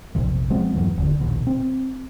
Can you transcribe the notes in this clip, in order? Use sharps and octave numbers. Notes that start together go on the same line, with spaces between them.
A#1 F2 C3 F3
F3 G#3 B3 C4
E2 G2 E3 F#3
F1 D#2 D3
A#1 D#2 B2
C4